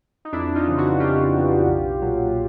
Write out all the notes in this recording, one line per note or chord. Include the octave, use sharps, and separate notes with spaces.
D#4
F2 D4 E4
D#4 F4
C#3 E3
E4 F#4
F2 F4 G4
C#3 E3
B1
A#2 F#3